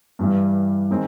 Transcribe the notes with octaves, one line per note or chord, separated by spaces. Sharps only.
G2 E3 G3
D#3 G#3 C4